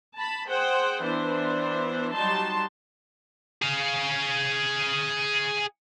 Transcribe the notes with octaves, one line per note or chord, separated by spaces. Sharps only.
A5 B5
G#4 C5 F#5 G5
E3 B3 D4 C5
F#3 G3 D#4 A5 C6
G#4 F5